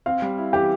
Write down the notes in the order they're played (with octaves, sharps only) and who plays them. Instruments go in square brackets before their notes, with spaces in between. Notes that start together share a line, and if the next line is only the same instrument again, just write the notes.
[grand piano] C4 [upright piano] F5
[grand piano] G3
E4
[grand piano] E3 [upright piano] G4